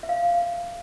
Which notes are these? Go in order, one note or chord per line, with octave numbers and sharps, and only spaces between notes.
E5
F5